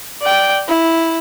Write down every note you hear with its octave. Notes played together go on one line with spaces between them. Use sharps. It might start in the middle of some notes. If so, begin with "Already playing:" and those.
D5 G5
E4